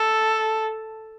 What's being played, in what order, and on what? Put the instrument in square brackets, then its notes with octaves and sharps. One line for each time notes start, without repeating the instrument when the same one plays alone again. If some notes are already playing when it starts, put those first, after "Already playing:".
Already playing: [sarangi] A4